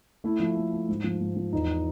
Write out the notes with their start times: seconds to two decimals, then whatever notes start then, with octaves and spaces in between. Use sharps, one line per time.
0.24 A3 E4
0.40 F3
0.57 A3
0.73 A3
0.89 G#2
1.04 F3
1.21 G#2
1.36 F3
1.53 E2 D#4